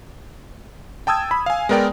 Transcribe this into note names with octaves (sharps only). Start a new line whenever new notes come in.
G5 A5 D#6 E6 G#6
B5
F5 G#5
G#3 B3 A#4 D5 G5